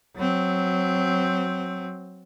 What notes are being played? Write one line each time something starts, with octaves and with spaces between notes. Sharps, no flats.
F#3 C4